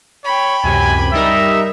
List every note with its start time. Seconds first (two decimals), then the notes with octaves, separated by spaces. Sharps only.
0.24 C#5 G5 B5
0.63 C#2 F#2 C3 G#5
1.13 G3 D#4 A#4 E5